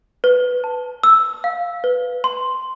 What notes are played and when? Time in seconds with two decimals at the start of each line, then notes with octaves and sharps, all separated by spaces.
0.24 B4
0.64 A5
1.03 E6
1.44 F5
1.84 B4
2.24 C6